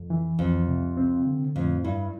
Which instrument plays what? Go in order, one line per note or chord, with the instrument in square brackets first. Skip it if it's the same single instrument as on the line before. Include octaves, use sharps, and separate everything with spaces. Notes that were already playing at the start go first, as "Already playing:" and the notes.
Already playing: [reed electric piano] F2
E3
[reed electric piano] C2 [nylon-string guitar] F2
[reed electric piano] C3
C4
D3
[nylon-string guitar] F2 [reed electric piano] A2
[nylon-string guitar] G2 [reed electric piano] E4